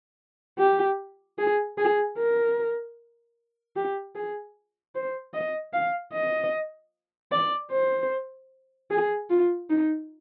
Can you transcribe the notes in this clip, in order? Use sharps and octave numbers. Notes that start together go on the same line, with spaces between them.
G4
G#4
G#4
A#4
G4
G#4
C5
D#5
F5
D#5
D5
C5
G#4
F4
D#4